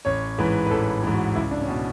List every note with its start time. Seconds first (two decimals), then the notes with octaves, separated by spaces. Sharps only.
0.05 A1 C#5
0.38 G#2 E3 B4
0.66 B4
0.70 A1 A4
1.03 G#2 E3
1.14 F#4
1.35 C#2 E4
1.51 D4
1.62 C#4
1.68 B2 D4